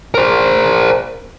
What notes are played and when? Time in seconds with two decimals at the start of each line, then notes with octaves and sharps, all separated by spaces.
0.14 A#4 C5